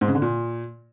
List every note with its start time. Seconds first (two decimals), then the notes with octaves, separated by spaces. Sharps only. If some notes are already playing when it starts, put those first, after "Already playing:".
0.01 G#2
0.08 C#3
0.15 D3
0.22 A#2